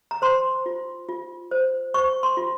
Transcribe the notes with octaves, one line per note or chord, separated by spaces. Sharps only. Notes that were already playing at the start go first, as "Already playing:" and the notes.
A#5
C5 C6
F4
F4
C5
C5 C#6
C6
F4